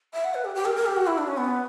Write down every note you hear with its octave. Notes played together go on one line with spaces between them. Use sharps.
E5
F#5
B4
G4
G4
A#4
A#4
G4
F#4
E4
D4
C#4
B3